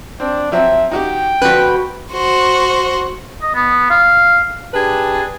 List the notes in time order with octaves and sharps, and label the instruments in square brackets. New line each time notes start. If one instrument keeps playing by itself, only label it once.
[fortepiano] C4 [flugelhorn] D4
[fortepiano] F3 F#3 C4 [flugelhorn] E5
[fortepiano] D#4 F#4 G4 [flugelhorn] G5
[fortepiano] D3 F3 [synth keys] F#4 B4
[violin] F#4 C5
[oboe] D#5
B3
F5
[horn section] D4 G4 G#4 B4 A5